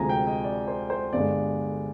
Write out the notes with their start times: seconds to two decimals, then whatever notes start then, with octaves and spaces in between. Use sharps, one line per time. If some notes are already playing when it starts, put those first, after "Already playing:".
Already playing: D2 C3 F3 G#3 G#5 A#5
0.09 G5
0.27 D#5
0.44 D5
0.68 C5
0.90 C5
1.13 G1 G2 D3 G#3 D5